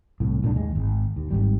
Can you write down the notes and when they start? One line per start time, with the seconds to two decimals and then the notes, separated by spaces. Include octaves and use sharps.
0.20 C2 A2
0.43 B1 A2 D#3 D4
0.55 D#2 G#3
0.75 G#1
1.16 D#2
1.31 G#1 G#2 G3